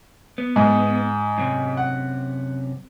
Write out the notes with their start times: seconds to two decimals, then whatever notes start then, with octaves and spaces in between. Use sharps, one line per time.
0.38 B3
0.56 G#2
1.38 F#2 C3
1.77 F#5